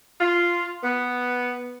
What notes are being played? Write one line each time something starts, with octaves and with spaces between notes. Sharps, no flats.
F4
B3